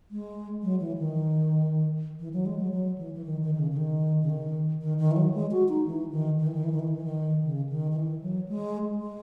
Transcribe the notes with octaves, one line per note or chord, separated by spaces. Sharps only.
G#3
F#3
E3
D#3
E3
F#3
G#3
F#3
F#3
E3
E3
D#3
D#3
D#3
C#3
C#3
D#3
C#3
D#3
D#3
D#3
E3
F#3
G#3
F#4
D#4
E3
D#3
D#3
E3
D#3
E3
D#3
E3
D#3
E3
D#3
C#3
D#3
D#3
E3
F#3
G#3
G#3